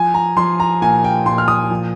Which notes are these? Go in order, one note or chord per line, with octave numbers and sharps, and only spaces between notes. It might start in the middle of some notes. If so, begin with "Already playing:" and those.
Already playing: F3 G#5
A#5
F3 C6
A#5
A#2 G#5
G5
A#2 C6
F6
D#6
F3